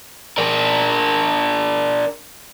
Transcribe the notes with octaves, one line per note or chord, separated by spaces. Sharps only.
D4 A#4